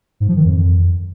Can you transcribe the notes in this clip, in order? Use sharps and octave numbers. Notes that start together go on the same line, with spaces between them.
G#2
F3
D#3
F2